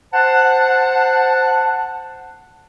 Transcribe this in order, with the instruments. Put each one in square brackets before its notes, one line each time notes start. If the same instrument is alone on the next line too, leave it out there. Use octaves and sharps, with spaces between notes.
[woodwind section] C5 F#5 A5